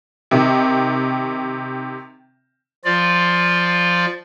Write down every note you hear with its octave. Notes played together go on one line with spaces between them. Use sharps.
C3 D#3
F3 F4 D5